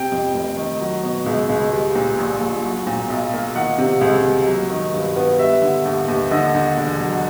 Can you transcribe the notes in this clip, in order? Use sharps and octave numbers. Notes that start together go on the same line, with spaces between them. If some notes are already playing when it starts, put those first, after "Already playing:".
Already playing: C3 G5
F2
F1
D#3
F#3
B2
C#2
C#2
G3
A#2
A#1
A#1
F#3
A#2
B1
A#3
D#3 F#5
C3
C#2
G3
F#3
D#3
G2
B3
G3 E5
D3
D#2
D#2
D3 D#5
D#2
E1
F#3